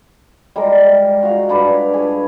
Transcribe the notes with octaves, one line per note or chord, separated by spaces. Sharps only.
G3 G#3 A#4
F#4 F5
G2 B4 D5
G#4 C#5